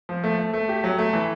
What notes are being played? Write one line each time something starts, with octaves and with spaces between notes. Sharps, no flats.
F3
A3
A3
A3
G4
F#3
A3
E3